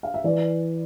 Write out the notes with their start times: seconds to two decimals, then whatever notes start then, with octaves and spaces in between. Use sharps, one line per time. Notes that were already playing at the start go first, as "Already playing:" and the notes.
0.03 F5
0.14 E5
0.24 E3 D5